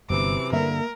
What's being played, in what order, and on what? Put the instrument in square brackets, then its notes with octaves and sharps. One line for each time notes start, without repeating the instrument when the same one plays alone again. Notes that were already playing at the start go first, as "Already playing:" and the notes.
[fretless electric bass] G1 [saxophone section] F#2 E3 C4 [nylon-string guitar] C3 [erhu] D6
[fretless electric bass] G2 D3 [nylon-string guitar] A#3 E5 [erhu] A#4